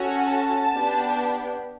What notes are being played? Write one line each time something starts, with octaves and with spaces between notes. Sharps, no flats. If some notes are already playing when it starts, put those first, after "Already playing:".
Already playing: C#4 F#4 A4
A5
B3 D4 G4